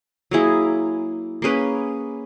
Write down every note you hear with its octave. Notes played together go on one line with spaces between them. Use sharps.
F#3 A#3 E4 G#4
A#3 C#4 G#4 B4